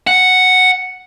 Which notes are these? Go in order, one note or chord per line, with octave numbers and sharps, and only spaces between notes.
F#5